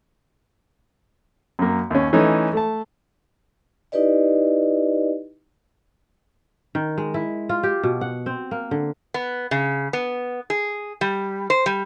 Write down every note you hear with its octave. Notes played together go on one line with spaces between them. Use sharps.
F#2 A#3
D#2 C#4
E3 A3 C#4 D#4
A3 A5
D#4 E4 G4 B4 D5 D#5
D#3
G#3
E4
F4
G4
B2
F#5
C4
A#3
D3
B3
C#3
B3
G#4
G3
C5
G3